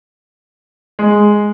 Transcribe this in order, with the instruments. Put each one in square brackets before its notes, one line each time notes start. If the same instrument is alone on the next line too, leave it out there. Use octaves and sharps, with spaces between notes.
[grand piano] G#3